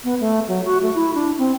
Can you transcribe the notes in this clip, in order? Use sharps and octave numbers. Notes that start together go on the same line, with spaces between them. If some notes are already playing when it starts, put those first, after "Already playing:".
B3
A3
F#3
F#4
A3
E4
D4
C4